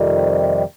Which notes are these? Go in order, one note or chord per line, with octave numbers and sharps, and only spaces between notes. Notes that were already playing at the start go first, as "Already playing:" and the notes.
Already playing: F2 C3 D#3 G3